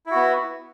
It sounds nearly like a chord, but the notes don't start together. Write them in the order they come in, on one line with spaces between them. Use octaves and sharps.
E4 F#4 B3